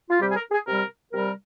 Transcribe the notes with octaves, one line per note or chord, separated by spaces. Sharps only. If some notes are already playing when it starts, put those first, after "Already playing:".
F4
C3 G3 G4
G#4
A#4
G#4
C3 G3 A#4
C3 G3 A#4